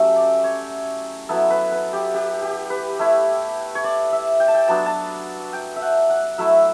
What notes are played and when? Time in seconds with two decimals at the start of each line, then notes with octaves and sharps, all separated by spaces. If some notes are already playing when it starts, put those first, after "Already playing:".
Already playing: F#3 A3 C#4 E4 G4 E5
0.16 D5
0.44 C#5
1.29 F#3 B3 E4 A4
1.50 B4
1.72 B4
1.93 G4
2.14 G4
2.42 G4
2.70 B4
2.99 A3 E4
3.75 C#5
3.84 D5
4.12 E5
4.40 G5
4.48 A5
4.55 G5
4.68 F#3 B3 D4 A5
4.86 A5
5.53 G5
5.76 E5
5.82 F#5
6.10 F#5
6.38 F#3 A3 E4 E5